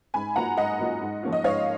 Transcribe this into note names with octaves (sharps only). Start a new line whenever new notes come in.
G#2 G#5 B5
F#3 A#3 F4 F#5 A#5
G#2 D#5 F#5
F#3 A#3 F4
G#2
F3 A#3 C#4 F4
D#5
G#2 C#5 F5